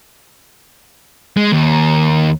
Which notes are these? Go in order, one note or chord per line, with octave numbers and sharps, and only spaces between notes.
G#3
D#2